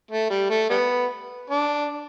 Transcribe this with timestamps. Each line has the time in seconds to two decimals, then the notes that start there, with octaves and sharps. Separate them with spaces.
0.11 A3
0.30 G3
0.50 A3
0.70 G3 B3
1.50 D4